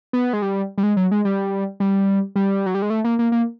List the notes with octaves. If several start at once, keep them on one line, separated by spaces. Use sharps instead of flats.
B3
G#3
G3
G3
G#3
F#3
G#3
G3
G3
G3
F#3
G3
G#3
A3
A#3
A#3
A#3